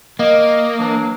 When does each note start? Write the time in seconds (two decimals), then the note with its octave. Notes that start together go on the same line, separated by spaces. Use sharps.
0.19 A#3 D#5
0.79 E3 F#3 D4